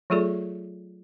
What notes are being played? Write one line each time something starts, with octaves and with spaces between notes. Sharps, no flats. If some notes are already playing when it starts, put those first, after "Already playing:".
F#3 A3 F4 G#4 A4 D5